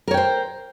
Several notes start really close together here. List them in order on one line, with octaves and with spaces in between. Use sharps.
A#4 C#5 G5 C5